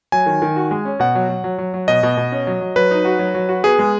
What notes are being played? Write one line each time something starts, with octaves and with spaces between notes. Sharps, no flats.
F#3 G#5
D#3
D#3
F#4
G#3
C#4
B2 F#5
F#3
F#3
F#3
F#3
F#3
B2 D#5
B2
B2
C#4
F#3
F#3
F#3 B4
D#4
F#4
F#3
F#3
F#4
B3 G#4
G#3